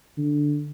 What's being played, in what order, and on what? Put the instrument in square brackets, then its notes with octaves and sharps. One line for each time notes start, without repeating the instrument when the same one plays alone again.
[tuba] D3